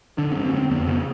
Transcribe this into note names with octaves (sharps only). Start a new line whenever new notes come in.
D3 D4
C#4
G2
C4
G2
C4
F2 B3
C#3 B3